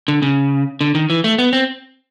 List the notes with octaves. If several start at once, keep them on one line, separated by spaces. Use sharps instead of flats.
D3
C#3
D3
D#3
E3
A3
B3
C4